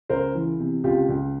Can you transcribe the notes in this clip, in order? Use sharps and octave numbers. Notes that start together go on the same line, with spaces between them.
C#2 A#4 C5
E3
C3
C#2 F4 G4
C#2